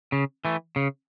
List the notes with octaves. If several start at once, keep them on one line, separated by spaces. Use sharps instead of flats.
C#3
E3 A3
C#3